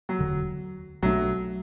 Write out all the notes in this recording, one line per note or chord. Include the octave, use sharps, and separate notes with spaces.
F#3
E1 D2 D3
B1 B2 F#3 A3 D4